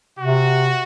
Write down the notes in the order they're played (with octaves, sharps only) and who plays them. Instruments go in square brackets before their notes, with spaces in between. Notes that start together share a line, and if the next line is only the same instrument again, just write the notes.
[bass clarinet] C3 [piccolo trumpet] F#4